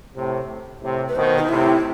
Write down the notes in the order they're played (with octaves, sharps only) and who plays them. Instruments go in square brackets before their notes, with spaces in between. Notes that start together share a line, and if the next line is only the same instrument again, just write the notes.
[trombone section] A2 C3
A2 C3
[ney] B4
[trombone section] B2 D#3 [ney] C5
[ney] D#4
[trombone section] A2 C3 [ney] E4